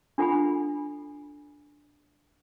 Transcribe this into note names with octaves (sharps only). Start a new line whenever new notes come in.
D4 F4 A4 F#5 G#5 B5